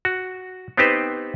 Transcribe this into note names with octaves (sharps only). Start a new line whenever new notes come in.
F#4
B3 C4 D#4 G4 B4 C5